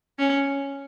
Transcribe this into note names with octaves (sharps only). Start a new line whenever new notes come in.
C#4